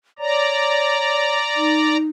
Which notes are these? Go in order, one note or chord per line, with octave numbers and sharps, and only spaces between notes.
C#5 D5 A#5
D#4